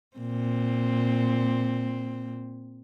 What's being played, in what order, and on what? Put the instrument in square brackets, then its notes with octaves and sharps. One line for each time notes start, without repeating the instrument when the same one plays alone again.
[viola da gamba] A#2 C4